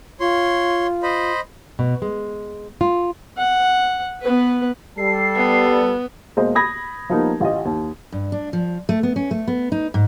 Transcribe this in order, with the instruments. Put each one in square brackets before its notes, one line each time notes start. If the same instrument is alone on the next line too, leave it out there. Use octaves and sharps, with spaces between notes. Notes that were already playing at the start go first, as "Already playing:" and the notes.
[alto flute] F4 [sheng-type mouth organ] C#5 C6
[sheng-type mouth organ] C5 D#5 B5
[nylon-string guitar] B2
G#3
F4
[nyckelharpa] F#5
B3 B4
[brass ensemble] G3 A4 [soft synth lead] C7
[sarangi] B3
[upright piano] B2 G#3 A#3 C5 D#5
B5 D#6 G#6 A#6
F3 G3 A#3 B3 D#4 A#4
A1 F4 G4 D#5
D#2
[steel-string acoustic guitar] G2
D4
F3
A3
B3
C#4
A3
B3
D#4
G#2